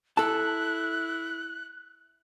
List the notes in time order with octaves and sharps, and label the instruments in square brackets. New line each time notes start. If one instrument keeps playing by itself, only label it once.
[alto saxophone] E4 [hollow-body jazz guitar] A4 A5 [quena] F#6